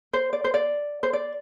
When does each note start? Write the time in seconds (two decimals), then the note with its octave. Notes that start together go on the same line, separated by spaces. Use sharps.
0.13 C5
0.33 D5
0.44 C5
0.54 D5
1.03 C5
1.13 D5